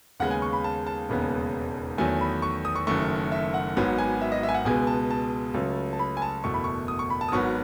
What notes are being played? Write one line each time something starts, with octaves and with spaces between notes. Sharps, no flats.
D#2 C#3 G#3 B3 F#5
G#5
C#6
B5
A5
A5
E1 D#2 C#3 G#3 B3
E2 D#3 F#3 A3 G#5
B5
C#6
D#6
C#6
F#1 F#2 D#3 A3 C#6
E5
F#5
G#1 G#2 F#3 B3
G#5
E5
D#5
E5
G#5
F#5
C#2 B2 G#3 B3 G#5
A5
A5
C#2 C#3 F#3 A3
A5
B5
G#5
A5
F#1 E2 B2 A3 C#6
B5
C#6
D#6
C#6
B5
A5
D#6
G#1 G#2 F#3 B3 C#6